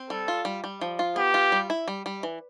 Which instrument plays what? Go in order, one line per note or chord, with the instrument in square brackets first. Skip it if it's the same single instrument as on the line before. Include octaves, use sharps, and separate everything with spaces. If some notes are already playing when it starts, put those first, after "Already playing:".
Already playing: [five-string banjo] C4
[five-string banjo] G3 [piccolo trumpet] A4
[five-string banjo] F4
G3
G3
F3
F4
[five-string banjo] B3 [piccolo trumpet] G4
[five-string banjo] F4
G3
E4
G3
G3
E3